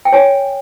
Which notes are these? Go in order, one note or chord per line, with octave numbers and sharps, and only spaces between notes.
G5
C#5 G#5